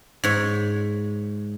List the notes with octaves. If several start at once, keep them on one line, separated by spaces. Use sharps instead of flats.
G#2 C#5